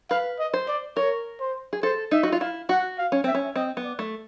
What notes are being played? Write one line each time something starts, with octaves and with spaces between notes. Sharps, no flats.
B4 F5
D#5
C5
D5
A#4 C#5
C5
G#4
A4 C5
D#4 E5
F#4
F4
E4 F5
F#4 F#5
F5
C#4
C4 E5
C#4
C4 D#5
B3
D5
A3